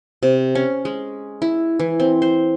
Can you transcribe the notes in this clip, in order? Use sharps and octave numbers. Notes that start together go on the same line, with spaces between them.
C3
C#4
G#3
E4
E3
C4
C5